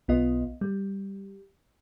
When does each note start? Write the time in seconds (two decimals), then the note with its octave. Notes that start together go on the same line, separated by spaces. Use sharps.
0.08 B1 B3 F4 D#5
0.61 G3